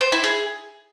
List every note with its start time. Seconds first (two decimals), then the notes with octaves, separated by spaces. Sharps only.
0.01 C5
0.12 E4
0.24 G#4